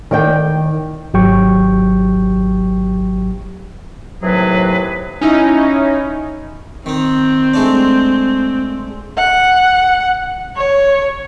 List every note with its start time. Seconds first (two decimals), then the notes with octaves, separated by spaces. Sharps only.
0.11 D#3 D5 G5
1.14 G#1 F#3 G4 G5 C#6
4.22 D#2 A2 C3 F#3 G#4 B4
5.21 C#4 D#4 E4
6.86 D#3 C4 D#4
7.54 G#3 A3 D4
9.17 F#5
10.56 C#5